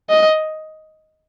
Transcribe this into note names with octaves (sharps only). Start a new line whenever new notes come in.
D#5